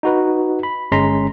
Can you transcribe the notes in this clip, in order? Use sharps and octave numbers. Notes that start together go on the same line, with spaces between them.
D#4 F#4 B4
B5
G1 G#3 C#4 A#5 C6 B6